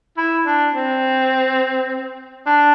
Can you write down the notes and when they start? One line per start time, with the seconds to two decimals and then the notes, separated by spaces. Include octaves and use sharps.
0.17 E4
0.46 D4
0.74 C4
2.46 D4